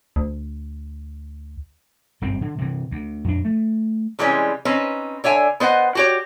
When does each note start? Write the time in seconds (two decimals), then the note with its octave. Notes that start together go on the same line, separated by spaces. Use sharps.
0.16 D2
2.22 G1 F#2 C4
2.41 D3
2.58 C3 E3
2.91 D2
3.24 F2 D4
3.45 A3
4.19 C3 E3 G3 G#3 C#4
4.65 C4 C#4 D#4 B4
5.24 D3 C#5 E5 G#5
5.60 B3 C5 D#5 F#5
5.95 F#4 G4 C#5